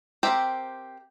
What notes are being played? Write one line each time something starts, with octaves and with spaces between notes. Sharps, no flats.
C4 G4 A#4 C5 E5